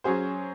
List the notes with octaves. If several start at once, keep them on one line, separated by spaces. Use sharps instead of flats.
F#3 C#4 G#4 C5